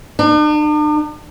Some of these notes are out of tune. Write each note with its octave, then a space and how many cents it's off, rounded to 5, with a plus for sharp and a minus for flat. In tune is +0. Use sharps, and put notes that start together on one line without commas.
D4 +45